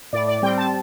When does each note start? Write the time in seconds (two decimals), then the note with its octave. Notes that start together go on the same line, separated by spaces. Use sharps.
0.13 A2 D5
0.28 D5
0.42 G3 C4 G5
0.58 A5